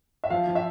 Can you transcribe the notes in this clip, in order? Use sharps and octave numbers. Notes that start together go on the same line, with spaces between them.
E5
F3 F5
F3
E5